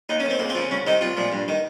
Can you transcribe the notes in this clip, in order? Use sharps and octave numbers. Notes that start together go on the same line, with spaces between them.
D#2 D#4
C#4
D#3
C4
C#2 A#3
C4
C#3 F3
C2 C#4
C3 D#3 D#4
C2 F4
A#2 F3
G2
D#3